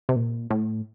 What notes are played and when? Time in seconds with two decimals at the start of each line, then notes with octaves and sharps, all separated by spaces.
0.09 C3
0.16 A#2
0.51 A2